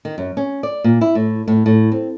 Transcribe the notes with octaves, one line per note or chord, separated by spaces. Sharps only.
D#3
F#2
C#4
D5
A#2
E4
A2
A2
A2
C4